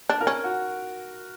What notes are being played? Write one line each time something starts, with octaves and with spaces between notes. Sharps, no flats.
D4
A#4
C#4
F#4